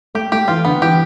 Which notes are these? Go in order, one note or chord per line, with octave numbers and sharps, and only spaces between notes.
A3 G4
A3 G4
E3 F4
D3 B3
E3 G4